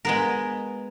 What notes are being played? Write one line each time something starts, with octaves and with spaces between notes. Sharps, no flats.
G#3 B3 A#4